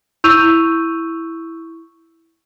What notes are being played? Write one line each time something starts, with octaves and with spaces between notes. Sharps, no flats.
E4 C#6 E6 G6 D#7 F7